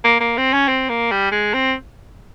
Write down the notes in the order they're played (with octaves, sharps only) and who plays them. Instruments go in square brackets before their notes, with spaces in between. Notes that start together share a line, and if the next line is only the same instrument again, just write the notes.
[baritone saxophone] A#3
A#3
C4
C#4
C4
A#3
G3
G#3
C4